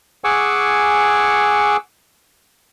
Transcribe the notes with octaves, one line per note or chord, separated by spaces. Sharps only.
G#4 F#5 G#5 C#6 D6 E6